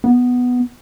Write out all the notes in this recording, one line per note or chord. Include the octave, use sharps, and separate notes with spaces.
B3